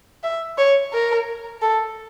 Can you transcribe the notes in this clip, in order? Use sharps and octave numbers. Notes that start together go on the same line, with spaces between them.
E5
C#5
A#4
A4